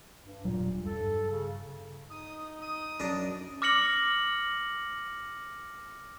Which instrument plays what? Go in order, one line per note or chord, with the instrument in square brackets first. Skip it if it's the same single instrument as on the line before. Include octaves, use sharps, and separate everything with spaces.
[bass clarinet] G2
[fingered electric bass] E1 F#3 G3 [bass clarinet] A#2
[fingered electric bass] G2 [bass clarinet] A4
[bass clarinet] C#3
[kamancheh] D#4 [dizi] D#6
[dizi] D#6
[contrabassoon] F#2 [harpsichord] D4 A#4
[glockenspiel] D6 F6 A#6 C#7 F#7